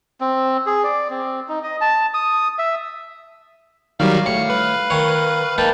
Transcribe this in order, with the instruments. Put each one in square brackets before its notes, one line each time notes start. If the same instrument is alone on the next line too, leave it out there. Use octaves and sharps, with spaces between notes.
[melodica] C4
G#4
D5
C4
D#4
D#5
A5
D#6
E5
[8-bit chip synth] D#3 F#3 G3 [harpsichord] D5 [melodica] F5
[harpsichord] A2 [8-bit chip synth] C#7
[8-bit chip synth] B4
[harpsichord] D#3 C#5
[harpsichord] A#3 D#4 B4 [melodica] G5 A5